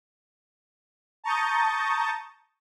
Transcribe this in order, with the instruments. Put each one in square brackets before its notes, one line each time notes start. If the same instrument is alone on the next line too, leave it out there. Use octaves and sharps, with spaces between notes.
[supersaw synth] A5 A#5 C#6 D#6 G6 A6